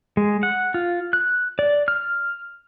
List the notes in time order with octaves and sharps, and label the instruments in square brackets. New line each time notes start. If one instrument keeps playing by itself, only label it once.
[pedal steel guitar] G#3
F#5
F4
F#6
D5
F6